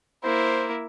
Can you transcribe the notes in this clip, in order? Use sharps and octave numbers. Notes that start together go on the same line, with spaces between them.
A#3 E4 C5